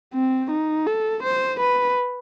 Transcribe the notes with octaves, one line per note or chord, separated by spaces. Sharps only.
C4
D#4
A4
C5
B4